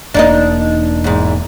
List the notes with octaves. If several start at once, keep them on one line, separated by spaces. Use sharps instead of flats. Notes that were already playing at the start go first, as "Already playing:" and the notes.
E1 A#3 D4 D#4 D#5
E2 G#2